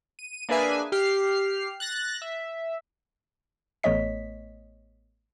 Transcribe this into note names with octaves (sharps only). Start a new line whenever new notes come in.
D#7
A#3 D4 G#4 B4 E5 G#5
G4 F6 C7
F#6 A6 A#6
E5
A1 A3 B3 C#5 D#5 B6